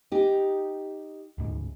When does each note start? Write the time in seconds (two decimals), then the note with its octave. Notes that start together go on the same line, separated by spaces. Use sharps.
0.12 D#4 G4
1.38 D2 G#2 C#3